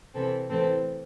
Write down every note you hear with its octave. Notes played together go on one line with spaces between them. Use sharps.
C3 E3 C4 A4
A2 E3 C4 A4 C5